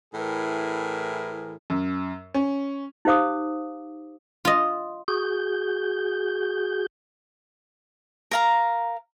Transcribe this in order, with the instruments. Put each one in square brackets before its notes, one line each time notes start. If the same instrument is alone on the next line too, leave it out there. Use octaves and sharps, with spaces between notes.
[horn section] A2 E3 G#4 A#4
[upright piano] F#2
C#4
[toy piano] D#4 G4 C5 F5 D6 D#6
[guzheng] F4 D#5
[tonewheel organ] F#4 G#4 G6
[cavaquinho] A#4 F5 A#5